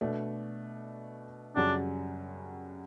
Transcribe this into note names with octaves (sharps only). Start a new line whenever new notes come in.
B2 A3 D4
F#2 C#3 G3 C#4 D4 F#4